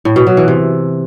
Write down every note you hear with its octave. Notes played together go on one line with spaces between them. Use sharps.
A2
B2
F#3
E3
C3